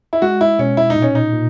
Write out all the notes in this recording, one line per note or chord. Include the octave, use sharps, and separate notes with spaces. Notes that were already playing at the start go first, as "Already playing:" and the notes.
E4
G#3 F#4
E4
B2 C#4
E4
D#4
A#2
C#4
D#4
A#2